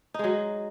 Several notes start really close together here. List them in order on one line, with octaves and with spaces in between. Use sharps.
D#4 G#3 F#3